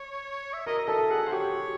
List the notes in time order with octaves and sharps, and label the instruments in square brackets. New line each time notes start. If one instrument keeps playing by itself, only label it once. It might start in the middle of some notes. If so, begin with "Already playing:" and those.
Already playing: [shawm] C#5
E5
[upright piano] A#4 [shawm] D#5
[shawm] D#5
[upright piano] A4 [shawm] E5
[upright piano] G#4 [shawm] F#5
[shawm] C5
[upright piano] G4 [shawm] C#5